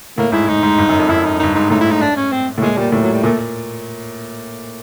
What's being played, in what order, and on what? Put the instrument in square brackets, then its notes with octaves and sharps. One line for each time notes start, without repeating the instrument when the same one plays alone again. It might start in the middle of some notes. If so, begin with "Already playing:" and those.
[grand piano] A2 [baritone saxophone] A#3
[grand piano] G#2 [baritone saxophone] E4
[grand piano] G#2 [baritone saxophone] D#4
[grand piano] G#2
G2
F#2
F2
[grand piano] F#2 [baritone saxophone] E4
[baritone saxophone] D#4
[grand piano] G2 [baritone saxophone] D#4
[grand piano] G#2 [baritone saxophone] D#4
[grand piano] A2 [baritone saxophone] D#4
[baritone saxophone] E4
D#4
D4
C#4
C4
[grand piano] A2
[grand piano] A#2 [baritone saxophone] G#3
[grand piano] A#2 [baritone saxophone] G3
[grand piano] A2 [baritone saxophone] G3
[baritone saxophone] F#3
G3
[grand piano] A#2 [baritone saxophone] A3